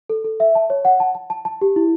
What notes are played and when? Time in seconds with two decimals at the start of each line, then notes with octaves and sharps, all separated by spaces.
0.09 A4
0.24 A4
0.40 E5
0.55 A5
0.70 C#5
0.85 F#5
1.00 A5
1.15 A5
1.30 A5
1.45 A5
1.61 G4
1.76 E4